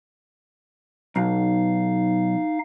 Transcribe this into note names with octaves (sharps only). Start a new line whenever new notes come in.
B1 D#4 F5